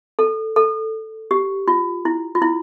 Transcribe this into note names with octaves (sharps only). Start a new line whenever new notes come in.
A4
A4
G4
F4
E4
F4
E4